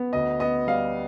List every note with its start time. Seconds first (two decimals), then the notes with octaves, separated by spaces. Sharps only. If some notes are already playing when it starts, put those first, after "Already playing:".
Already playing: B3
0.13 D2 D#5
0.40 B3 D#5
0.67 G3 F5